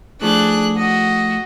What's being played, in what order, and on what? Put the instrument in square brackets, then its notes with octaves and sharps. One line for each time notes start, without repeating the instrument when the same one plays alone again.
[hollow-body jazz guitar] A2 F3 [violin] D4 F#6 [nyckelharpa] G#4
[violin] F#4 [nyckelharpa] D#5